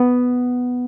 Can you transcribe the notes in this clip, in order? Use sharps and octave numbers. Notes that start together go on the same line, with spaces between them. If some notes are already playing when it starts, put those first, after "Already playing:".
Already playing: B3